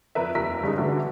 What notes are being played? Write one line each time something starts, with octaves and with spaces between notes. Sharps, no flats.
F2 A#4 B4 E5
F1 D#2 F4 A#4 E6 B6
G2 C#3 G#3 D#4
B2 D3 E3 F#3 A3